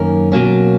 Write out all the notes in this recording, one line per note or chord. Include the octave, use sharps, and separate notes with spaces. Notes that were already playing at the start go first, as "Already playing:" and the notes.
Already playing: F#2 D#3 A#3 C#4 A#4
B2 F#3 A#3 C#4